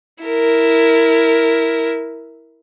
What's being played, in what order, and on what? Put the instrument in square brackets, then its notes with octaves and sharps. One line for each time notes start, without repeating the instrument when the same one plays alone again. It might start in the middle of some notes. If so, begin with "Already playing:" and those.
[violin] E4 A#4